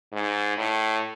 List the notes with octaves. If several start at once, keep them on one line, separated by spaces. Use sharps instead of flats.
G#2
A2